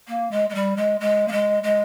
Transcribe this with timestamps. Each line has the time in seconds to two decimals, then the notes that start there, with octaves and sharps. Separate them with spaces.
0.08 A#3
0.31 G#3
0.50 G#3
0.55 G3
0.77 G#3
1.00 G#3
1.28 A#3
1.32 G#3
1.63 G#3